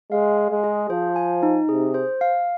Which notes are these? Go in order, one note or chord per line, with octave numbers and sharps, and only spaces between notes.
G#3 F5
G#5
G#3
G#4
F3 C5
G#5
D#4
C3 G#4
C5
F5